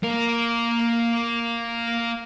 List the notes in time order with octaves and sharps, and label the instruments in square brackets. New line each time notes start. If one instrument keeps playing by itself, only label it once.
[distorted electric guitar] A#3 A#4